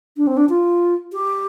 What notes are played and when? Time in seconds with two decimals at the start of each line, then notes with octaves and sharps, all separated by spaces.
0.17 D4
0.27 C4
0.37 D4
0.49 F4
1.13 G4